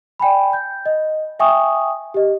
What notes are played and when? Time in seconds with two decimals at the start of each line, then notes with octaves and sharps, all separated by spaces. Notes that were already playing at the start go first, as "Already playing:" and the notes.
0.19 D5 G5 G#5 B5
0.53 G6
0.86 D#5
1.40 E5 G5 G#5 C#6 D#6
2.14 G4 D#5